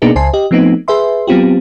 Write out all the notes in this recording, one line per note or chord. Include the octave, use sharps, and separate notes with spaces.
B2 A#3 B3 D4 D#4 G#4
C#2 C5 G#5 A5 C7
G4 D#5
F3 A3 B3 C4 D#4
G#4 B4 E5 C6
F#3 B3 C4 F4 G4